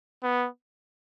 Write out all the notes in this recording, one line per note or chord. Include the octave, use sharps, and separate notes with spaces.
B3